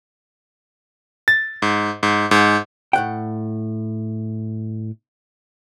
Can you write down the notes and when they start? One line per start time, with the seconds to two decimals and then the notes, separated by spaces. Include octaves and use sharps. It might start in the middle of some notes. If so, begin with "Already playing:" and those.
1.28 A6
1.62 G#2
2.03 G#2
2.31 G#2
2.93 A2 F#5 G5